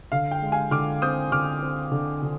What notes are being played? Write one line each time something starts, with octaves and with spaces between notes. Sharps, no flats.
D3 F5
G5
G#3
F5 G#5
D3 D6 F6
C4 D#6 G6
D3 D6 F6
C4
D3
D3